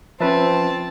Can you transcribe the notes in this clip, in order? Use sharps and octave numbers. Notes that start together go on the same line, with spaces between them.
F3 C4 C#4 B4 E5 A5